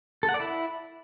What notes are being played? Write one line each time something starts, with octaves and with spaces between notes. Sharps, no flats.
A4
F#5
D5
E4